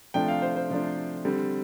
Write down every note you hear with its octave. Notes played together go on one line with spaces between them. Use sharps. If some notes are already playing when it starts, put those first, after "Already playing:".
C3 F3 A3 D4 G5
F5
C5
C5
C3 F3 A3 D4
D3 G3 C4